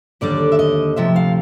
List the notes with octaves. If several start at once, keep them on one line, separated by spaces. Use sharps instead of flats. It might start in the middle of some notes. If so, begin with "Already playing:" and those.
D#2 D3 G3 D5
E5
D#5
D2 C3 F3 E5
F5